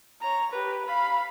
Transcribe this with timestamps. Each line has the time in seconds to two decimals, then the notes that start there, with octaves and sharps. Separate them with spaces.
0.22 C#5 A#5
0.51 G4 B4
0.86 F5 B5